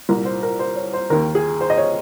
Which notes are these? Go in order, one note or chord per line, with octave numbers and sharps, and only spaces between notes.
C2 A#2 A#4
C5
A#4
C5
C#5
C5
D#2 D#3 A#4
G#4
C5
D#5
C#5